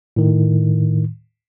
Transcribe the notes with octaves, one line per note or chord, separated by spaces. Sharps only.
A2 D#3